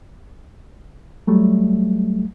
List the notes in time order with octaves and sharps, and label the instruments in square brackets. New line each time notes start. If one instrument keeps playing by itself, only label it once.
[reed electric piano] F#3 G3 A3